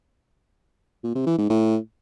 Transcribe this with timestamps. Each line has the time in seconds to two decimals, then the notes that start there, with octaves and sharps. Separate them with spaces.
1.04 A#2
1.15 C3
1.26 E3
1.38 G#2
1.49 A2